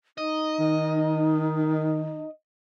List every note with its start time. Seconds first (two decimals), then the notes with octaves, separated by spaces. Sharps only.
0.18 D#4 D#5
0.59 D#3